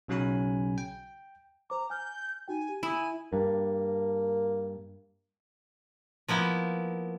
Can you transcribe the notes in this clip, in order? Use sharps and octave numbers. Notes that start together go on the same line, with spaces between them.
B1 C#3 F#3 C#4 G#5 B5
G5
C5 A#5 D6
G#5 F6 G6
D#4 F#4 G5 G#5
G4
E4 G#5 B5 D#6
G2 A#3
F3 A#3 B3 E4